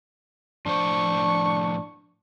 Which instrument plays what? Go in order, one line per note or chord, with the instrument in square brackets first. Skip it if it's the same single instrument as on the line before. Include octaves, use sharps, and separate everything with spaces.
[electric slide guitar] A2 F3 C5 [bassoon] D4 [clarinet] C#6